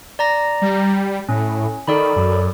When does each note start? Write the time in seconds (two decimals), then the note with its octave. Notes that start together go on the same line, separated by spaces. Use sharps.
0.19 D5 A#5 A#6
0.62 G3
1.29 A2 C#4
1.88 D#3 A4 D5 B5
2.16 F#2